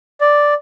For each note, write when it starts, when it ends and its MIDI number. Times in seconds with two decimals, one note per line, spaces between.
0.21 0.54 74